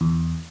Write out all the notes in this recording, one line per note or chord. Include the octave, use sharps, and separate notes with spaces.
E2